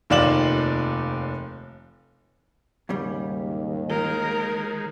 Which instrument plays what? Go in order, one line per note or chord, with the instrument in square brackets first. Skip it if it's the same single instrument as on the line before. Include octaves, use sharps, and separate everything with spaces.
[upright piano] F1 D#2 F4 D5 E7 F#7
[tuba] D#2 [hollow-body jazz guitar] G#2 C#3 G3
[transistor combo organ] D#3 G#3 [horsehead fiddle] A#4